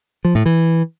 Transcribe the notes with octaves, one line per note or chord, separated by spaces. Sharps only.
F3
A2
E3